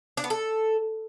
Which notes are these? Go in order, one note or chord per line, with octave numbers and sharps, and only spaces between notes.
D4
B3
A4